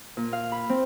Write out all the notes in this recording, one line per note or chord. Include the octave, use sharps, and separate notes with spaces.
A#2
F5
B5
C4